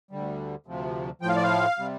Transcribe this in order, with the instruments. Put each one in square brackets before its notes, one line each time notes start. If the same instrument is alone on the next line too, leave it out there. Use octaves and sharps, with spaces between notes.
[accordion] D2 D3 G3
D2 C3 F3
A2 F3 G5
F5
D5
F5
C3 G3